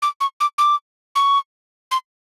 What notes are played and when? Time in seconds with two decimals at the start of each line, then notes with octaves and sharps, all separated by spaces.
0.02 D6
0.21 C#6
0.40 D6
0.58 D6
1.16 C#6
1.91 C6